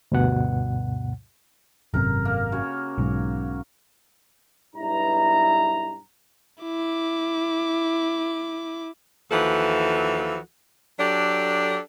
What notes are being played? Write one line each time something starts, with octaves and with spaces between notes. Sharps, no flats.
D2 G2 B2 F#5
G#1 F#2 C3 A#4 A#5
A#3
C#3 F#4 C#5
B1 G#2
B1 G2 E4 A#5
E4 D6
D#2 E3 F3 F#4 A4
F#3 D4 G4 A4